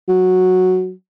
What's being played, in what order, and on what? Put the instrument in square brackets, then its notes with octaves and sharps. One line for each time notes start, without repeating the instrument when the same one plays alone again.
[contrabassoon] F#3